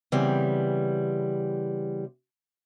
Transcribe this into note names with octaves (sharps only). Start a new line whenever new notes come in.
C#3 E3 G3 B3 C4